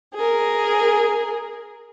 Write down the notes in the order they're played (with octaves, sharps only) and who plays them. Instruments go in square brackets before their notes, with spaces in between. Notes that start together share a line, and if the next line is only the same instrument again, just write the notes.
[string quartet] G#4 A#4